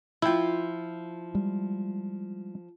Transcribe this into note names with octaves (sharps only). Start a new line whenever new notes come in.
F3 E4 F4 G5
G3 G#3